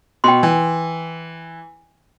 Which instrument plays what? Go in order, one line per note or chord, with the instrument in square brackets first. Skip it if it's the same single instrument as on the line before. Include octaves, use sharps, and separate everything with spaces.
[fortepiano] B2 [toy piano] G5 C6
[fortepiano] E3